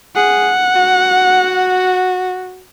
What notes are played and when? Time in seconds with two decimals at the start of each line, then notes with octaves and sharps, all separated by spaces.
0.16 G#4 F#5
0.76 F#4